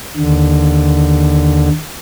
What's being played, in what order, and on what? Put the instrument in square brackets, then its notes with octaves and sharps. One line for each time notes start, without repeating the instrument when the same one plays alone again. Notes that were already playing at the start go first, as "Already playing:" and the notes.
[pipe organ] D#2 D3